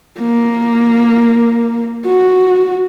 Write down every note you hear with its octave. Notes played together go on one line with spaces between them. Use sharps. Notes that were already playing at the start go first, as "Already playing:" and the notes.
A#3
F#4